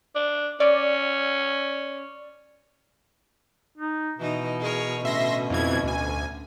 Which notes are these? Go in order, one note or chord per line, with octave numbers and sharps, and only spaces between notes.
D4
C#4 D5
D#4
B2 E3 D#4
G#4 A#4 C#5
A2 D3 C#4 E5 C6 A#6
F2 E3 G#6
D2 G#5